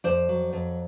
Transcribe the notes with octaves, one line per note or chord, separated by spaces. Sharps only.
F2 C5 D5
F#3
F2